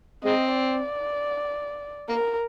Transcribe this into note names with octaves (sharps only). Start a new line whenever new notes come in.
G#3 C4 D#5
D5
A#3 A#4